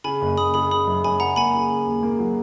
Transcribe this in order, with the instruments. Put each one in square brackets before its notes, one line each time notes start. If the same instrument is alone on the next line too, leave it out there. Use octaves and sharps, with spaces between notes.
[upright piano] C#3 [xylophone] G#5 B5
[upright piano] F#1
[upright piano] F#1 [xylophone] B5 D#6
[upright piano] C#3 [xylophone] B5 D#6
[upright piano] C#3 [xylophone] B5 D#6
[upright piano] F#2
[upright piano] F#2 [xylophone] G#5 B5
[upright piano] C#3 [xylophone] F#5 A#5
[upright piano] A#3 [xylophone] G#5 B5
[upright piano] C#3
C#3
D#2
A#3
F#3